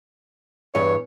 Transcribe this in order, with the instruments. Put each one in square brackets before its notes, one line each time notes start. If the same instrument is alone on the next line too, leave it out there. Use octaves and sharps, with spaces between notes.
[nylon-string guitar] E2 G2 G3 [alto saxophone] C#5